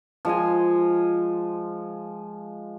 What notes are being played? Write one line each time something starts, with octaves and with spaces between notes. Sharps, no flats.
F3 G#3 D#5 G#5